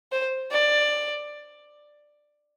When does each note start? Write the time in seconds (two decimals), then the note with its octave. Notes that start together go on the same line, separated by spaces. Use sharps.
0.12 C5
0.52 D5